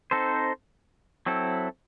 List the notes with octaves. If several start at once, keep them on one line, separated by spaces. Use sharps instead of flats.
C4 D#4 A4 C5
F#3 C4 E4 A4